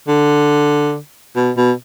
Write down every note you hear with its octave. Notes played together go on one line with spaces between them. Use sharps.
D3
B2
B2